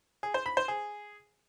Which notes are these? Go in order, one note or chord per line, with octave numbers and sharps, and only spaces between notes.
G#4
C5
B5
C5
G#4